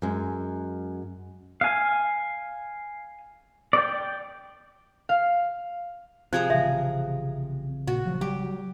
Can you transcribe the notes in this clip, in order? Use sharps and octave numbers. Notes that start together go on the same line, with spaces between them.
F#2 G#3
F5 G#5
D5 G5
F5
C3 F3 G#4 A#5 F#6 G#6
A1 C#3 E5
A#2 F#4
F3 F#3
F#3 G3 G4